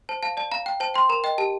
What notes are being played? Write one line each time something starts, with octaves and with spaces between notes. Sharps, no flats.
C5 A5
F5 A5
D5 A5
F5 A#5
G5
C5 A5
G5 C6
A#4 A#5
D#5 G5
G4 A5